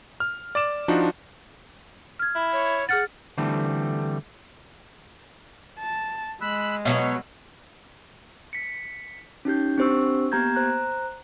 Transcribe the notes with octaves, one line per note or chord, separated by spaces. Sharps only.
F6
D5 D6 E7
F3 D4 D#4 F4 F#4
F6 G#6
E4
C#5
G#4 F#5 F6 A6
D3 E3 G3 A3 C4
A5
G#3 B5 E6 F#6
B2 D3 F#3 C#5
B6 C#7
C#4 D#4 G4 G6
C4 D4 G4 C5 C#6 E6
A#3 B3 G4 A#5 G6 G#6
C5 A#5 F#6